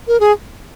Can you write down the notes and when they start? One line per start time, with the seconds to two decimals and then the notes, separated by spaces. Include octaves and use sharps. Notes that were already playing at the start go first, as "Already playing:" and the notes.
0.08 A#4
0.20 G#4